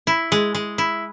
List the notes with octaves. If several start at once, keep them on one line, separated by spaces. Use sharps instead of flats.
E4
G#3
G#3
E4